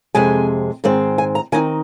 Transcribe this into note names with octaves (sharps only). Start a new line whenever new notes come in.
F2 C3 G#3 G#5
G#2 D#3 G#3 C4
G#5
A#5
D#3 C4 D#4 G#5